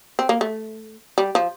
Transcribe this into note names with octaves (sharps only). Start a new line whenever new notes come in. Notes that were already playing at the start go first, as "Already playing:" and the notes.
C4
A#3
A3
G3
F3